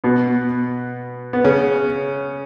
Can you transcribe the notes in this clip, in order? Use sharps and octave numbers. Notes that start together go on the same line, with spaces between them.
B2 B3
B3
C#3 C#4